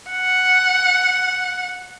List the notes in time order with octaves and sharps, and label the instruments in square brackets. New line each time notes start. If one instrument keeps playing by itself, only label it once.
[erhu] F#5